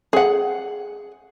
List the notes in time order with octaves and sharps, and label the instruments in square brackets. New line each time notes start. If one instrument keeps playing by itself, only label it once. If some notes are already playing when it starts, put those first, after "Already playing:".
[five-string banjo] G#4 F#5